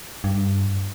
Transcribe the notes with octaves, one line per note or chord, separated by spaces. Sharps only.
G2